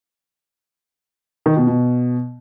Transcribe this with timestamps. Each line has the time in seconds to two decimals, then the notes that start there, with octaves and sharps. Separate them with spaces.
1.46 D#3
1.56 B2
1.67 B2